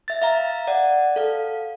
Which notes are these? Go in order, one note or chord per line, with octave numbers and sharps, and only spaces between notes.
E5 A6
E5 F5 A#5
D5 F#5
A4 F5